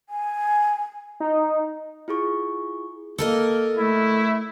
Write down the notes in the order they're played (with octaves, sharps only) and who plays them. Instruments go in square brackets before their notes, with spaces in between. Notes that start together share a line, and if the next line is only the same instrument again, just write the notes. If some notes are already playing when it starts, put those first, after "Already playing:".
[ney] G#5
[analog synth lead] D#4
[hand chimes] E4 F4 G#4 C#6
[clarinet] A#3 [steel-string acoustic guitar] A4 A#4 D#5
[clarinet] A3 [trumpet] E4